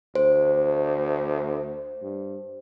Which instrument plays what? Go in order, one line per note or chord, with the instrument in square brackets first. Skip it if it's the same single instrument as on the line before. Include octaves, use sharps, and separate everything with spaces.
[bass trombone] D2 [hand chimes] C5
[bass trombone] G2